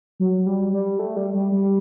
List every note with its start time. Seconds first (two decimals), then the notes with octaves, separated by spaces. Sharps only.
0.20 F#3
0.46 G3
0.72 G3
0.99 A3
1.16 G3
1.34 G3
1.52 G3